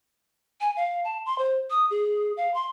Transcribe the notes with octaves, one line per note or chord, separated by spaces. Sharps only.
G#5
F5
A5
C6
C5
D#6
G#4
F5
C6